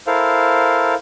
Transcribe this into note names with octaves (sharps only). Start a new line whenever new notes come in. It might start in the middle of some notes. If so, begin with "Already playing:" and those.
E4 A4 A#4 C5 F5